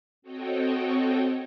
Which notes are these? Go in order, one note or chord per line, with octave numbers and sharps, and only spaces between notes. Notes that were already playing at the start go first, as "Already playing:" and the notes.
C4 F#4 A4 C#5 D#5 G5